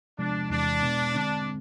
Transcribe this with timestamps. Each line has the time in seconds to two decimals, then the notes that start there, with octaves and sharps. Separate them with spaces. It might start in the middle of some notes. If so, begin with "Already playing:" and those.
0.18 C3 F3 G#3 B3 D4
0.50 E2 C3 E3 G#3 D4
0.83 B2 G#3 B3
1.14 D3 G#3 C4 D4